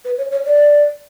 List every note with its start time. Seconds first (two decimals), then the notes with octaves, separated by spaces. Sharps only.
0.05 B4
0.18 C#5
0.32 C#5
0.45 D5